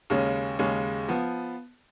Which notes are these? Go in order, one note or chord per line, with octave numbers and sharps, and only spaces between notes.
D#2 C#3 G#3 C#4
D#2 C#3 G#3 C#4
F3 B3